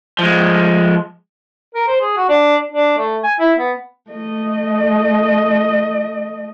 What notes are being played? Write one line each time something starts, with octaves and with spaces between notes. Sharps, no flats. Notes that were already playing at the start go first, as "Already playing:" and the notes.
F3 G#3
A#4
C5
G#4
F#4
D4
D4
A3
G#5
E4
B3
A3 D#5